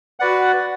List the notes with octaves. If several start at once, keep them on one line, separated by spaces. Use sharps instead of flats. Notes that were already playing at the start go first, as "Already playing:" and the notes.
F#4 B4 D5 F#5